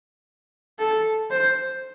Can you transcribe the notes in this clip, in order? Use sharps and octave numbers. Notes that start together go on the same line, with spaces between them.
A4
C5